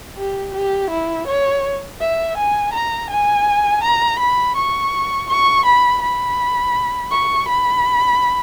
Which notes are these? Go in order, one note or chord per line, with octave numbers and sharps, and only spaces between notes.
G4
G4
E4
C#5
E5
G#5
A#5
G#5
A#5
B5
C#6
C#6
B5
B5
C#6
B5